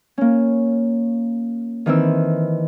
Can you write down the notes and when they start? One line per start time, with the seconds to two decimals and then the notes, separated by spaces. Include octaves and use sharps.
0.18 A#3 C#4
1.86 D#3 E3 C4 E6